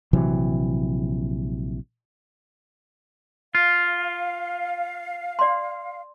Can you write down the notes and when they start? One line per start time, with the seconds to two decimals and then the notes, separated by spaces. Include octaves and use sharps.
0.13 A#1 C3 E3 F#3
3.55 F4 F5
5.39 D5 C6